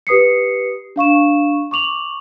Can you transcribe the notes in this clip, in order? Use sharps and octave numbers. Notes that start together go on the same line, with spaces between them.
G4 B4 D#6 C7 C#7
D4 F5 C#6 E7
C#6 D6 F7 F#7